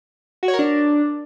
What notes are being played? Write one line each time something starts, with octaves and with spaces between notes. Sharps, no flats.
F#4
C#5
A#4
D4